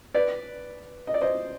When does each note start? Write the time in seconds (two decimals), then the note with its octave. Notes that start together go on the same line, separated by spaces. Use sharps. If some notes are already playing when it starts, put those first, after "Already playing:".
0.15 B4 D5
1.07 D#5
1.14 D5
1.21 C5 D#5